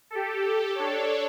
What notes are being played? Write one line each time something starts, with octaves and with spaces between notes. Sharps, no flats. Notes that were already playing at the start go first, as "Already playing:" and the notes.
G4 A4
D4 A4 C#5